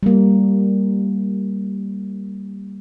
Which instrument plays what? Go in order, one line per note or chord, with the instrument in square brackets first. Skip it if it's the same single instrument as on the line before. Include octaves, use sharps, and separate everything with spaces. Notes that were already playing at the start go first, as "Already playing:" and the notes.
[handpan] G3 A#3